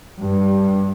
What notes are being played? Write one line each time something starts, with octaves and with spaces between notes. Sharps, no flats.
G2